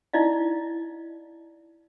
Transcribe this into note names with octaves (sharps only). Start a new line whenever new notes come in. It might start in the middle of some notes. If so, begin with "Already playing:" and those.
D#4 E4 D5 D#5 F5